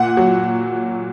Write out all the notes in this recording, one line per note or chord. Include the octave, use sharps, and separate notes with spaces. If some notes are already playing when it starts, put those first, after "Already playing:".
Already playing: A#2 F#5
F#3